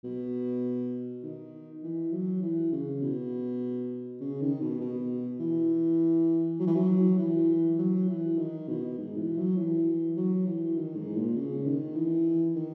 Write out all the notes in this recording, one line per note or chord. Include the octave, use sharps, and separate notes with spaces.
B2
D#3
E3
F#3
E3
C#3
B2
C#3
D#3
B2
B2
E3
F#3
E3
F#3
E3
F#3
E3
D#3
B2
G#2
E3
F#3
E3
F#3
E3
D#3
G#2
A#2
C#3
D#3
E3
D#3